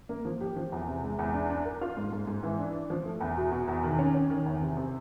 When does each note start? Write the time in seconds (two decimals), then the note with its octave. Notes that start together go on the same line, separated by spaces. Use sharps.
0.09 A#3
0.25 F3
0.41 G4
0.56 F3
0.72 E2
0.88 C3
1.03 G#3
1.19 E2
1.34 D4
1.50 D4
1.65 A#4
1.81 F4
1.97 G#2
2.12 G#2
2.27 G#2
2.43 E3
2.58 D4
2.75 D4
2.90 F3
3.05 A3
3.21 E2
3.37 B2
3.52 B2
3.68 E2
3.84 D#3
3.99 C#4
4.14 C#4
4.30 D#3
4.46 E2
4.62 C3
4.77 C3